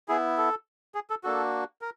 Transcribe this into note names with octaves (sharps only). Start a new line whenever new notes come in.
B3 E4 G#4
A4
G#4
A4
A#3 D4 F#4 A4
A#4